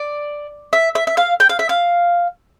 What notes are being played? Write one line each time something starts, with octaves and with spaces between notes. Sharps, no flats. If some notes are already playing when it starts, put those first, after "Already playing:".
Already playing: D5
E5
E5
E5
F5
G5
F5
E5
F5